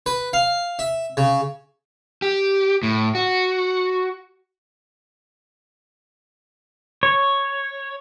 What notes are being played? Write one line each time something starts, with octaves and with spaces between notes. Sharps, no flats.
B4
F5
E5
C#3
G4
A2
F#4
C#5